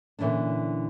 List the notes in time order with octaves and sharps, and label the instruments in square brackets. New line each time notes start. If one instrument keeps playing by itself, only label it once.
[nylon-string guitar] A#2 D3 E3 C#4 D4